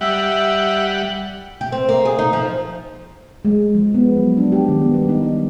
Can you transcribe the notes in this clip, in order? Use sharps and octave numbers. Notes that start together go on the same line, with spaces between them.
G3 E5 F#5
G4
C4
A#3
G#4
D#4
F3
G#3
F3
B3
F#3
D4
G4
D#3
B3
G3
D#4
D#4